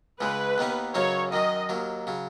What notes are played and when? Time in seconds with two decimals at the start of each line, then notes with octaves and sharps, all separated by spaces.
0.21 C#2 C#3 G#3 B4
0.58 D#2 D#3 B3 D#4
0.95 F#2 C#3 F#3 D#4 C#5
1.32 F#2 D#3 F#3 D#5
1.69 D#2 D#3 F#3
2.07 C#3 F#3